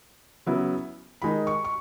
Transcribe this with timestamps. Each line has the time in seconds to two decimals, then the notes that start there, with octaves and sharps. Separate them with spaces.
0.46 C#3 F#3 B3 E4
1.22 D#3 G#3 D#4 B5
1.47 C#6
1.65 C#6